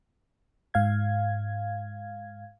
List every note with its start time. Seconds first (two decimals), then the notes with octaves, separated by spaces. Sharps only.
0.74 G#2 F5 G#6